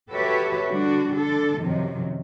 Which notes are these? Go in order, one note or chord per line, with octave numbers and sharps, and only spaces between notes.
F#4 G4 A4 B4 C#5 E5
D3 G3 D4 F#4
D3 D4 A4
F#2 C3 D#3 F3 F#3